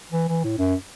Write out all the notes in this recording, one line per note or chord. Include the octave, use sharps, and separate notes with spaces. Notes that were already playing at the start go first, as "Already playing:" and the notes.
E3
E3
A2
F#2